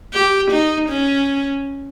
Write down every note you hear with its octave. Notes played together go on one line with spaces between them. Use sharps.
G4
D#4
C#4